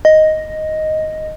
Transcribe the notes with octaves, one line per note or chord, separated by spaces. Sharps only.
D#5